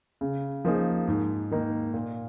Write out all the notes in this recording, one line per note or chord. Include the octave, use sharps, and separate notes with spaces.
C#3
F3 A#3 D#4 G#4
G#2
D#3 A#3 D#4
A#2